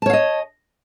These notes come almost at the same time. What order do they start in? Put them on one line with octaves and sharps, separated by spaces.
A5 C#5 F5 D#5